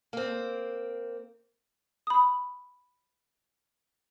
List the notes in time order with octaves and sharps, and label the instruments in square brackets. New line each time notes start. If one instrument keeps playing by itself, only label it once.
[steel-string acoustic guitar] A#3 C4
[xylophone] B5 D#6